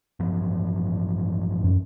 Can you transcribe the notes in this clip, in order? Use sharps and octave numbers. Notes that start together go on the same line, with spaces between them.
A1 G2 F3
F#2